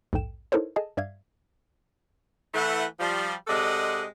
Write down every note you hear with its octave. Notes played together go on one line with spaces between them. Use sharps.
A#1 D#2 G#2 A4 G5 E7
D#4 E4 A4 A#4 C5 C#5
G#4 A4 D#5 G#5 A5
G2 D5 E5 F5 G#6
E3 A3 F#5
F3 G3
C3 G#3 A4 D5 D#5 F#5